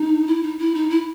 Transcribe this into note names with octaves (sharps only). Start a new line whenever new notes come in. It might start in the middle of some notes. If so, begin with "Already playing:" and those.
Already playing: D#4
E4
D#4
E4
D#4
E4